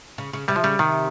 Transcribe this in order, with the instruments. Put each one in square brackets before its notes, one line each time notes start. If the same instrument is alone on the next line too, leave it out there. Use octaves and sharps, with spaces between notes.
[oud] C#3
C#3
[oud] C3 [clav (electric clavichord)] G3
[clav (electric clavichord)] F3
[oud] C#3 [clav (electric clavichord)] G3
[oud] C3 [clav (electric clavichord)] D#3